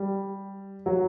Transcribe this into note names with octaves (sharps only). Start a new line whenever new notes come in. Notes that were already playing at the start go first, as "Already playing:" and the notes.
Already playing: G3
F#3